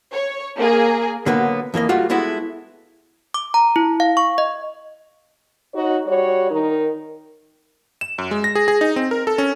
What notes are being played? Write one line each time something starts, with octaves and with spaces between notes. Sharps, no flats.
C#5
A#3 G#4
D3 F#3 A#3 B3
F2 E3 A#3 D#5
G3 A3 F4 F#4
G#3 B3 E4 F#4 A4
D6
A#5
E4
F5
C#6
D#5
D#4 F#4 C#5
G3 F#4 C#5
D#3 D#4 A#4
E7
F#2
G#3
A#6
G#4
G#4
D#4
C4
A#4
A4
C#4